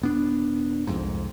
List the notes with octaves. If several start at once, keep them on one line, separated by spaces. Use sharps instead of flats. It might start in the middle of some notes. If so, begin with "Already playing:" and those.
D#1 B3 D4
C2 F2 G#2